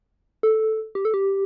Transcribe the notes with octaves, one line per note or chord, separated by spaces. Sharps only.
A4
G4
A4
G4